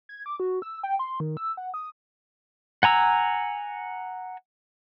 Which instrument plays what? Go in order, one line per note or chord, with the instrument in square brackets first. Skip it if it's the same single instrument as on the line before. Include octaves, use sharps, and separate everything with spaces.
[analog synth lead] G#6
D6
F#4
E6
G5
C6
D#3
E6
F#5
D#6
[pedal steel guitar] F#5 G#5 A#5 E6